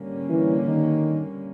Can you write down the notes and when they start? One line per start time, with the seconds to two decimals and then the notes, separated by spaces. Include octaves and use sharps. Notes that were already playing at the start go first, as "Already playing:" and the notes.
Already playing: D3 G3 A#3 C#4
0.29 E3
0.67 D#3